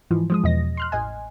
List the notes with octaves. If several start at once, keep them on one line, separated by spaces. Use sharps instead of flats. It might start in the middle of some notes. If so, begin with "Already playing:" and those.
G#2 E3 F3
F3 G#3 D#6
E2 B2 D#5 A#6
C6 F6 F#6
A1 D#5 G#5